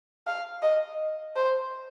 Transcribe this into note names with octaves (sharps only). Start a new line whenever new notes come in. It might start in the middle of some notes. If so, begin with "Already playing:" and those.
F5
D#5
C5